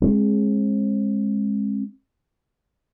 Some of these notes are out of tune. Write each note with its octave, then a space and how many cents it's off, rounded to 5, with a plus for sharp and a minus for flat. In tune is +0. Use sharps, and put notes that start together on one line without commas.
G#3 +0 C4 +45